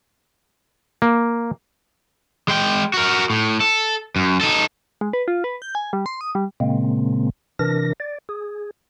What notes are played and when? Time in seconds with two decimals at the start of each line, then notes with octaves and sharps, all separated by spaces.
1.02 A#3
2.48 G#3 G5
2.94 F#4 A#4
3.30 A2
3.61 A4
4.16 F#2
4.41 D#4 A4
5.01 G#3
5.13 B4
5.28 F4
5.44 B4
5.62 G6
5.75 G#5
5.93 G3
6.06 C6
6.21 D#6
6.35 G3
6.60 A#2 C#3 G#3 A#3 C4
7.59 C3 E3 D4 A#4 A#6
8.00 D5
8.29 G#4